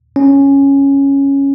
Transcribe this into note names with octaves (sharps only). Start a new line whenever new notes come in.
C#4